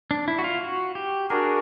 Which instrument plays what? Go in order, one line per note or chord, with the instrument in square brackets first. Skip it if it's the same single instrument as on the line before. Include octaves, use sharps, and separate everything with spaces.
[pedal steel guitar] D4
E4
F#4
F4
F#4
G4
[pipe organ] D4 F#4 A#4 [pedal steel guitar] G#4